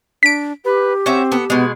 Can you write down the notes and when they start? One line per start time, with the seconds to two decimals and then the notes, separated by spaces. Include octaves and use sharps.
0.23 D4 B6 D7
0.65 G4 B4
1.06 C4 C#4 F#4 E5
1.32 B3 A4
1.50 B2 G#3 B3